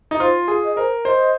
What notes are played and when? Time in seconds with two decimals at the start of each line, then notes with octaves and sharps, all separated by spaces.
0.11 D#4
0.20 F4 C5
0.48 G#4
0.64 D#5
0.77 A#4 C5
1.05 C5 D#5